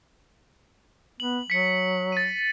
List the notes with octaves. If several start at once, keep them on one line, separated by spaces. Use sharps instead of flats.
B3 F#7
F#3 B6 C#7
A6 D#7